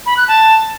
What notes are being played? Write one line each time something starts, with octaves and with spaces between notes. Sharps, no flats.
B5
F#6
A5